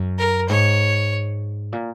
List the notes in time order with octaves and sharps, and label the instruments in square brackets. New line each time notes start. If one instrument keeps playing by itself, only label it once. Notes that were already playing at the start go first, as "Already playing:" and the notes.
Already playing: [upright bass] F#2
[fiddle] A#4
[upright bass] G#2 [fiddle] C#5
[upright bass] A#2